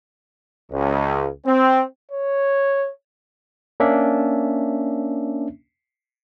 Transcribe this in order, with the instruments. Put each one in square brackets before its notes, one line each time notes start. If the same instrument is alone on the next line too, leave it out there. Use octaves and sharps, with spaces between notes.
[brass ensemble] C#2
C4
[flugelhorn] C#5
[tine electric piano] A#3 C#4 D4 E5